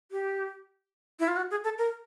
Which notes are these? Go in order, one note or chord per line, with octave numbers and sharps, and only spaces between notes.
G4
E4
F4
F#4
G#4
A4
A#4